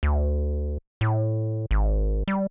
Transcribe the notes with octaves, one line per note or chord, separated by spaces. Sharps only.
D2
A2
G#1
G3